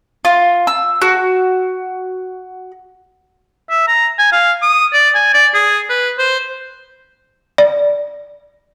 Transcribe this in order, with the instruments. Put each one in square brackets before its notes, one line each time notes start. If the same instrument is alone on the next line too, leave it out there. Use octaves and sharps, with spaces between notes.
[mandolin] F4
E6
F#4
[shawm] E5
A#5
G#5
F5
D#6
D5
G#5
D5
G#4
B4
C5
[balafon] D5